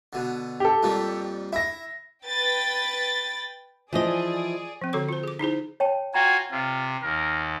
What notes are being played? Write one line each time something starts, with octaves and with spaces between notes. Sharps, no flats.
B2 D3
G4 A4
F2 A#2 G3
E4 E5 A#6
B4 G5 A6
E3 F3 G#4 D5 D#5
F3 C4
D3 F#4 A4 C#5 D6
F4 C5
G#4 D6
D#4 E4 G#4 C5
C#5 G5 A5
F4 F#4 G5 G#5 A#5
C3 F4
D#2 A#4